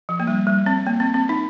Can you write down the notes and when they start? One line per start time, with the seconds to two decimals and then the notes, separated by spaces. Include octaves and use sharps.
0.09 F3
0.20 A#3
0.27 G3
0.47 G3
0.66 C4
0.86 A#3
1.00 C4
1.14 C4
1.29 D#4